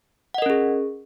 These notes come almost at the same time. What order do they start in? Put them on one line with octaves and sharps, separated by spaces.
F#5 D#5 A#4 C#4 G#4